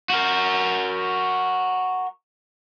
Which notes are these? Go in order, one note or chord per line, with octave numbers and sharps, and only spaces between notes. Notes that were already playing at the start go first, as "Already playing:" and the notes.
F#4 A#4